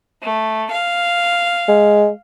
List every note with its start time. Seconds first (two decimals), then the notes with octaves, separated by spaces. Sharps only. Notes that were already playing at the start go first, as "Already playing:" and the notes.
0.23 A3
0.71 F5
1.68 G#3